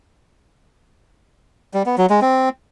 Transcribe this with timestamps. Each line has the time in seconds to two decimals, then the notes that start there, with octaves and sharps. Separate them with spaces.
1.74 G3
1.86 B3
1.98 F#3
2.10 G#3
2.22 C4